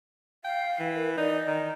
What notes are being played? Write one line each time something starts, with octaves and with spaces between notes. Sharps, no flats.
F5 G5
E3
A#4
D#4 D5
D#3 A#5